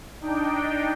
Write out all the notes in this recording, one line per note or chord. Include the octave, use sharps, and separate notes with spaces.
D4 D#4 G5